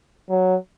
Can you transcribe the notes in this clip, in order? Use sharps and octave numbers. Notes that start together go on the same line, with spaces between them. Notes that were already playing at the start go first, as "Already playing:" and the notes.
F#3